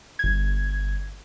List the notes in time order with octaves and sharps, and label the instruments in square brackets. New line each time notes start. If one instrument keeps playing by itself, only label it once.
[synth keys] G1 G#6